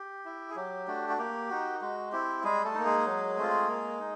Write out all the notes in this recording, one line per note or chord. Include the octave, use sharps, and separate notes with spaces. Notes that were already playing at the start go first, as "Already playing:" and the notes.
Already playing: G4
E4
G#4
F#3 G4
A3 D4 F#4
F#4
A#3 G4
D#4 F#4
G#3 F#4
C4 E4 G4
G3 G#3 G#4
A3 A4
A#3 D#4
G#3 G#4
F#3
A3 C4 F4
A#3
D#4